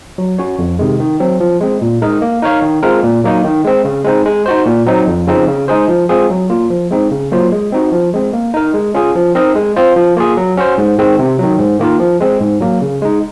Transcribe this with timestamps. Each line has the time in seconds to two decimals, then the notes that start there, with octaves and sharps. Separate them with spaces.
0.18 F#3
0.39 C#4 F#4 C#5
0.59 F2
0.79 C3 D#3 G#3
0.99 D#3
1.20 F#3 C4
1.40 F3
1.61 G#3 C4
1.81 A#2
2.02 G#3 D#4 A#4 D#5
2.22 A#3
2.42 D#4 A#4 C#5 F5
2.62 D#3
2.83 G#3 C4 F4 A#4
3.03 A#2
3.24 F#3 A#3 D#4
3.44 D#3
3.64 G#3 C4
3.85 C#3
4.05 G#3 C4 D#4
4.26 G#3
4.46 D#4 F#4 C5
4.66 A#2
4.86 F#3 C4 D#4
5.07 F2
5.27 C#3 F3 C4 D#4
5.48 C#3
5.68 G#3 D#4 G#4 C5
5.88 F3
6.09 G#3 C4 F4 G#4
6.30 F#3
6.50 A#3 F4
6.70 F3
6.91 G#3 C4 D#4
7.11 C#3
7.32 F#3 A#3 F4 C5
7.52 G#3
7.72 C4 D#4 F#4
7.92 F3
8.13 G#3 C4
8.33 A#3
8.54 D#4 A#4
8.74 G#3
8.94 C#4 F4 G#4
9.15 F3
9.35 C4 D#4 A#4 D#5
9.55 G#3
9.76 C4 F4 C5
9.96 F3
10.17 A#3 F4 G#4
10.37 F#3
10.58 C#4 F#4 C5
10.78 G#2
10.98 D#3 G#3 C4
11.19 C3
11.39 D#3 F#3
11.59 G#2
11.79 D#3 A#3 F4 A#4
12.00 F3
12.20 G#3 C4
12.41 G#2
12.61 F#3 A#3
12.81 C#3
13.02 G#3 D#4